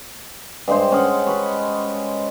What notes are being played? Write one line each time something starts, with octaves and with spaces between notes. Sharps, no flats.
G2 G#3 C5
C#4 D#5 F#5
B4 C#5